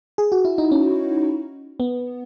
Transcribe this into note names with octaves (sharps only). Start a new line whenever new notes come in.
G#4
F#4
E4
D#4
C#4
B3